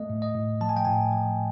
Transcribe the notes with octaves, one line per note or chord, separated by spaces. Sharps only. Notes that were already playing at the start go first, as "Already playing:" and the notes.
Already playing: A3 D#5
A2
D#5
A2
F3 A5
G#5
G5
A2 G#5
F3